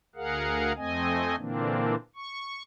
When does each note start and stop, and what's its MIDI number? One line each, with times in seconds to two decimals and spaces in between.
0.16 0.72 38
0.16 0.72 68
0.16 0.72 70
0.16 0.72 77
0.16 0.72 78
0.76 1.36 41
0.76 1.36 57
0.76 1.36 60
0.76 1.36 75
0.76 1.36 80
1.36 1.95 46
1.36 1.95 50
1.36 1.95 52
1.36 1.95 58
1.36 1.95 60
1.36 1.95 62
2.16 2.63 85